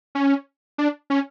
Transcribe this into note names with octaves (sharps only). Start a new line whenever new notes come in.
C#4
D4
C#4